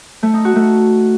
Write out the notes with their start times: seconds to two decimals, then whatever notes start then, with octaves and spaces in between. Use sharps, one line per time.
0.23 A3
0.34 D#4
0.45 F#4
0.56 A3